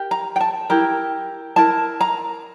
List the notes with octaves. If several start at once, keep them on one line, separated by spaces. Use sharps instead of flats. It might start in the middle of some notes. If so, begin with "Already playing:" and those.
Already playing: G4 A#4
A#5
G5
A5
E4 G4 A#4 A#5
E4 A#4 A5
A#5